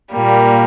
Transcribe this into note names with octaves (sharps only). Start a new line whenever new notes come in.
A#2 G3 A#3